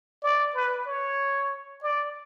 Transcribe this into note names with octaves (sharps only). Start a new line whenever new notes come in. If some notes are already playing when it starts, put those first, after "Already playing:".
D5
B4
C#5
D5